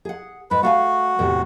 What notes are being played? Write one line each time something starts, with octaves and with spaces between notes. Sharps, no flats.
G#4 F#5
G#2 B4
A3 F#4 F5 G#5
E2 A2 C3